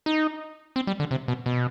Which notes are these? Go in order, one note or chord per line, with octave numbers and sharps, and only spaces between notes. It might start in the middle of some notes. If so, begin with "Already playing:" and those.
D#4
C4
G3
D3
C3
B2
B2